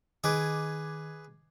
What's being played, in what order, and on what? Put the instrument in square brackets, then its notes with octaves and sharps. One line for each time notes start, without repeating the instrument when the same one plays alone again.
[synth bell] D#3 D6 G#6 [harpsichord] G#4 B4